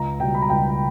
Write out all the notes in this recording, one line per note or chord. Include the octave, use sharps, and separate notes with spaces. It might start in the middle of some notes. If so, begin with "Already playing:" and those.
Already playing: C#2 A#5
B2 G3 G5
B5
A#5
C#2 G5